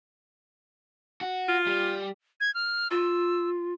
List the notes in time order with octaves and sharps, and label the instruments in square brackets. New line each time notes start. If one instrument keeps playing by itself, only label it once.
[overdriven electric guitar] F#4
[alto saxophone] F4
[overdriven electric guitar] G3
[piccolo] G#6
F6
[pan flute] F4 [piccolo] E6